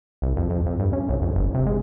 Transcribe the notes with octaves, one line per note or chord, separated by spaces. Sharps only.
C2
F2
F2
F2
G2
C#4
C2
F2
G1
C3
G#3